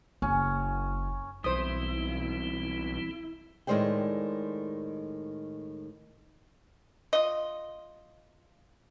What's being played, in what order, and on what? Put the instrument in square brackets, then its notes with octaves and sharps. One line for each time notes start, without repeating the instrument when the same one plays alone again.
[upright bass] F#1 [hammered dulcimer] C#4
[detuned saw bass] B1 [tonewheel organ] E3 G3 C4 [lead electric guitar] E4 [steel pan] C5 D#6
[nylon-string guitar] A2 D#3 G#3 C5 D5 G5
[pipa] F4 D#5